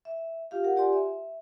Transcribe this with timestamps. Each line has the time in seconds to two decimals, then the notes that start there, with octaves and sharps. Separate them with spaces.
0.05 E5
0.51 F4 G4 F5
0.64 A#4 F#5
0.76 F4 G4 D5 G#5 C6
0.93 E5